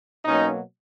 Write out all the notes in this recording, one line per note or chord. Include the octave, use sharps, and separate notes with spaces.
B2 F#3 A#3 C#4 D#4